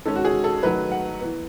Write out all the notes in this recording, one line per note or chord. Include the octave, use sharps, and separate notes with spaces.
D#3 G#3 C#4 A4
F#4
G#4
A4
D#3 F#3 A3 B4
F#5
E3 B3